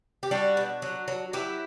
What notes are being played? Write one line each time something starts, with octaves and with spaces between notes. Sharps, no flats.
G4
G3 D4 F#4
B2
F#3
F#3
F#3 E4 G4